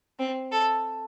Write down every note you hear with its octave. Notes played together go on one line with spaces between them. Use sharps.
C4
A4